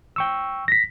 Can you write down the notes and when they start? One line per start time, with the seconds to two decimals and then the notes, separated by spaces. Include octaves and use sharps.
0.16 G5 C#6 E6
0.68 A#6 B6